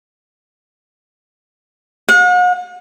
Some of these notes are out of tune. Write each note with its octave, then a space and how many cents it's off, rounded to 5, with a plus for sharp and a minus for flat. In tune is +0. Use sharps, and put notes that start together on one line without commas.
F#5 -45